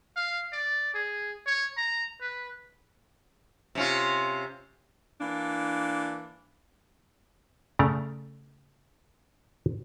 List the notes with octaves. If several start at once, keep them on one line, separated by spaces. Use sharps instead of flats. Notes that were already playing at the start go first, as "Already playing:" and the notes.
F5
D5
G#4
C#5
A#5
B4
C3 C#4 F4
E3 A#3 D4
C#3 A3 D5 A#5